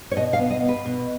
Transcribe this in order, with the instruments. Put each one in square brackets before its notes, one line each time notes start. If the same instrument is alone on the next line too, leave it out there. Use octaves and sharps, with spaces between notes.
[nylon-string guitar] C#5
B2 D#5
F5
B3
D#5
B3
B4
B2